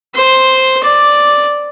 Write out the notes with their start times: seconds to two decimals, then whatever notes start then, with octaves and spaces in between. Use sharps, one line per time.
0.14 C5
0.83 D5